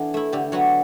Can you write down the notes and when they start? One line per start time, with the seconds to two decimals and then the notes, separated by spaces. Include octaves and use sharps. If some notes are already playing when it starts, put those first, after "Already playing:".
Already playing: E3 B3 D4 A4
0.14 A3 E4
0.33 D3 G4
0.52 F#3 B3 F#4